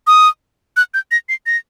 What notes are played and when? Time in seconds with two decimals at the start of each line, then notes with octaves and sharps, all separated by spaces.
0.07 D#6
0.77 F#6
0.94 G6
1.11 A#6
1.29 C7
1.46 A#6